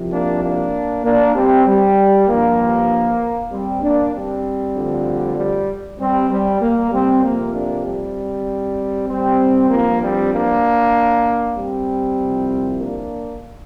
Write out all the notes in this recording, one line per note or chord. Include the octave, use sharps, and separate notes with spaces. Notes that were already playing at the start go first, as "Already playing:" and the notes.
Already playing: C2 C3 F3
A#3 D4
A#3 D4
A#3 D4
G3 C4
G3
G2 F3 A#3
G3 C4
A#3 D4
G3 C4
D2 D3 F3
G3
G3 C4
G3
A#3
G3 C4
F2 C3 F3 A#3
A#3 D4
G3 C4
G3 C4
G2 F3 A#3
G3 C4
A#3 D4
G3 C4
C2 C3 F3
A#3 D4